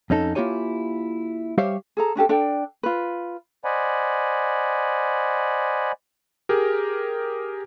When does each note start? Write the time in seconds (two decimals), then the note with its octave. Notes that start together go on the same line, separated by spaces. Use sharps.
0.10 F2 C#4 D#4 A4
0.35 A#3 E4 F4 G4 C#5 G#5
1.58 G3 G4 C5 C#5 E5 F5
1.97 G#4 A4 A#5
2.15 C#4 D4 G4 A4
2.29 D4 A4 D5 G5
2.83 F4 B4
3.65 C5 D5 D#5 F#5 G#5 B5
6.49 G4 G#4 A#4